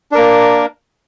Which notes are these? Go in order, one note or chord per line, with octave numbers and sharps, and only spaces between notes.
A#3 D4 A#4